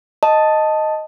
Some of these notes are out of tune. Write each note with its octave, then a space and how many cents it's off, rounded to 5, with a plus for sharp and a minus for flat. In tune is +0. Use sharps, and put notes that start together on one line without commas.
D#5 +0 A5 +0